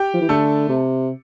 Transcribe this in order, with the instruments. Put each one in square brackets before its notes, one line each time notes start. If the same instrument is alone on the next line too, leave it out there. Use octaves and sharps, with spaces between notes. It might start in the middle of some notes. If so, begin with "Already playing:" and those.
Already playing: [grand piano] G4 G5
[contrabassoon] F3
E3
[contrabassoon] D3 [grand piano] A3 A4
[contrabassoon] C3